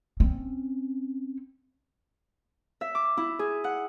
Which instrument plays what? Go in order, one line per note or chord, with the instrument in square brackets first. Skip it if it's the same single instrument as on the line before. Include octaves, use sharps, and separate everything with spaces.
[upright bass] C4 C#4
[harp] E5
D6
E4
G#4
F#5